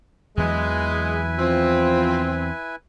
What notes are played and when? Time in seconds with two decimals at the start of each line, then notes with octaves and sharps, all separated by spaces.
0.37 E2 E3 F#3 G#3 E4 B4 G#5
1.39 F3 C4